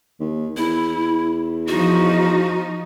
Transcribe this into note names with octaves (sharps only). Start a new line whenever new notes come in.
D#2
E2 E4
F3 D#4 F#4